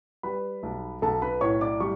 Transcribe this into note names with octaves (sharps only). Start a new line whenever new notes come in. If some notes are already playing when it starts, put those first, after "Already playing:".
G3 B4 B5
B1
B1 A4 A5
B4 B5
A2 C#5 C#6
D5 D6
G3 C#6